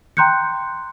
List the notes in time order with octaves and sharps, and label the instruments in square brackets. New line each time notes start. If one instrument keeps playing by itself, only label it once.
[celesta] G5 A#5 C6 F#6 G6 C#7